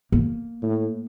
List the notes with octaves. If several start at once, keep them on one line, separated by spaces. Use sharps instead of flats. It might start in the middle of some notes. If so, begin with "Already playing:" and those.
A#3
A2